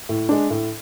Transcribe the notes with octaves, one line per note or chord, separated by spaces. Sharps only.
A2
G#3 D4
A2